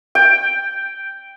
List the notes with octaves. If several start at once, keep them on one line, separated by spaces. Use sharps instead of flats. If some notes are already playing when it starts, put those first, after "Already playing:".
G5